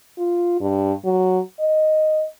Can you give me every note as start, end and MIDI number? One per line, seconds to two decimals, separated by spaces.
0.18 0.57 65
0.60 0.93 43
1.05 1.40 54
1.60 2.24 75